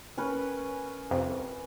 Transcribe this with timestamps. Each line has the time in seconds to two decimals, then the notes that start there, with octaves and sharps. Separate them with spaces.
0.17 C#4 A#4 B4
1.11 C2 F2